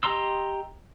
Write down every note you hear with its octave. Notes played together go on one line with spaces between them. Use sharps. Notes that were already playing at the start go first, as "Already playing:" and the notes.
G4 D#5 A#5 C6 E6